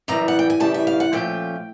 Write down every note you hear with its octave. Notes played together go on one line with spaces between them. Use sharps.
F#2 C#3 E3 G3 A#5
F#5
G5
G#5
F#2 C#3 E3 G3 A5
E5
F5
F#5
A#2 F3 A3 C#4 F4 G5